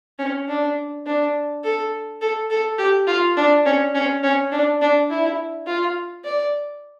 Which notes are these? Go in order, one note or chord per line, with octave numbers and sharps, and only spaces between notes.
C#4
D4
D4
A4
A4
A4
G4
F4
D4
C#4
C#4
C#4
D4
D4
E4
F4
D5